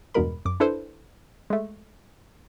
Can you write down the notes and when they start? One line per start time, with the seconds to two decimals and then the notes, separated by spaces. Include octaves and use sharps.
0.14 E2 G2 B2 G#3 A#4 B5
0.45 F#2 D6
0.60 D4 E4 A4 B4 C5
1.50 G#3 A3